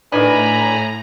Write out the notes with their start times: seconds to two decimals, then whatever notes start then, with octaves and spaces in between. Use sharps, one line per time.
0.12 A2 D#3 E3 D4 G#5 A#5 B5